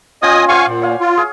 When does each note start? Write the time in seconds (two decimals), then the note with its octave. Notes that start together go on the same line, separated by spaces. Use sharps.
0.22 C#4 F4 D#5 G5 G#5 D#6
0.48 C5 D5 F5 F#5 G#5 C#6
0.67 A#2
0.82 C#5 F5 G#5
1.01 F4
1.17 G#4